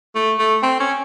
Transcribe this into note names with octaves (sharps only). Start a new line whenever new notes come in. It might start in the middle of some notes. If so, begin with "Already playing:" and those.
A3
A3
C4
C#4